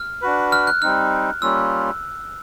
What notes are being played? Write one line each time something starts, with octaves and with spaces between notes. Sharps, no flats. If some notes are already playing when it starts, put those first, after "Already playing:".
Already playing: F6
D4 F#4 B4
F6
F#6
G3 C4 D#4 F6
G3 A#3 C#4 F4 E6